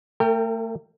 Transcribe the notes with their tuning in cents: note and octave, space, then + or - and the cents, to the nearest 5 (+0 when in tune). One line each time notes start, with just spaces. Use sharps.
A3 +30 A#4 -35 G5 +10